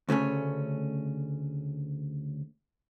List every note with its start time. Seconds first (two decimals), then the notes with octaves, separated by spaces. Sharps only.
0.09 D2 C#3 A3 C#4